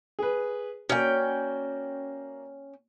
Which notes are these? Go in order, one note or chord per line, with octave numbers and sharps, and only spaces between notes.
G#4 B4
A#3 C#4 F#4 D5 G5